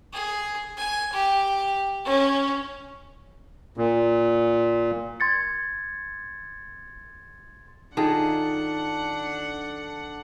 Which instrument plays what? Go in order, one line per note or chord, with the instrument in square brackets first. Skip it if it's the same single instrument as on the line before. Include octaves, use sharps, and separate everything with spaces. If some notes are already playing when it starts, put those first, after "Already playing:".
[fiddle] G#4
G#5
G4
C#4
[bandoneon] A#2
[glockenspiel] C6 G#6 A6 C#7
[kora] D#3 F4 G#4 [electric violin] D4 F#5 [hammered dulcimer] A4